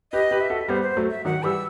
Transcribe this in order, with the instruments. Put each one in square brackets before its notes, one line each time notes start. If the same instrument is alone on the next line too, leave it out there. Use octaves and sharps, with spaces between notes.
[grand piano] G4 B4 [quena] D#5
[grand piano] G4 B4
[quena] E5
[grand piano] F#4 A4
[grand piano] G3 B3 [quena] C5
[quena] C5
[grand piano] F#3 A3
[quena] E5
[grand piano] D#3 F#3 [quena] F#5
[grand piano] E3 G3 [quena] E6